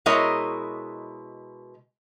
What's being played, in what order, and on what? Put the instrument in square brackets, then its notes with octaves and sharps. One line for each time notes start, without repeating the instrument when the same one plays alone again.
[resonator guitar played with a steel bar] B2 G#3 E4 A#4 C#5 D#5